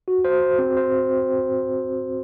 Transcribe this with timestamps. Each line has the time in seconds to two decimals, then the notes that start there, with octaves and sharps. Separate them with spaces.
0.08 F#4
0.25 C5
0.42 C5
0.59 C4
0.77 C5
0.94 C4